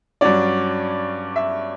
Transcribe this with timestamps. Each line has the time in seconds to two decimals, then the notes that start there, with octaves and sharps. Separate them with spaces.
0.21 G2 F#3 C#4 D5
1.36 E5